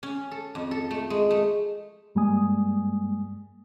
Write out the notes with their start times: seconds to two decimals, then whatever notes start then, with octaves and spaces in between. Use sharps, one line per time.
0.03 C#4
0.31 A4
0.55 F2
0.71 A4
0.91 A3
1.10 G#3
1.30 A3
2.15 G2 G3 G#3 A#3 G#5 D#6